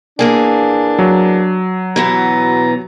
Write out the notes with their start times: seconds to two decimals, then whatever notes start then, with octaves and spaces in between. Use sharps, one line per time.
0.19 E3 A#3 D4 G#4
0.99 F#3
1.96 B2 E3 B3 A#5